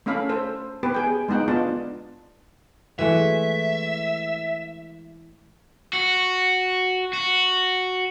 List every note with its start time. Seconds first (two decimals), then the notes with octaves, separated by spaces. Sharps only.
0.06 A3 C#4 A4 F5 B5
0.29 A4 C5
0.83 B3 G4 B4
0.95 G#4 G5
1.29 G#3 B3 D#4 F#5 G5
1.48 B3 D4 F4 D#5 A5
2.99 E3 G#3 A3 E5
5.93 F#4
7.13 F#4